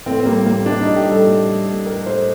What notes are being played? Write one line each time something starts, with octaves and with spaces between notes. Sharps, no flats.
A2 C4
C4
G3 A#3
A2 A#3
G3 D4
A2 D#4
G4
G3
A4
A2
G3
A2
G3 A#4
A2 C5